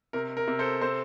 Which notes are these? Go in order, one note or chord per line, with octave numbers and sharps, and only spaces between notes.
C3 A#4
A#4
C3
A4 C5
C4 A4 C5